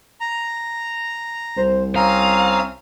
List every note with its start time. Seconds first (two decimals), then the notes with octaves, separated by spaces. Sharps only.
0.20 A#5
1.57 C2 C5
1.96 C4 C#4 F5 A#5 D#6